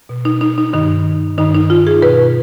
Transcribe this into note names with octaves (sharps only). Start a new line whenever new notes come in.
B2
D#4
D#4
D#4
G2 D#3 D#4
G2 D#3 D#4
D#4
F4
G#4
B2 B4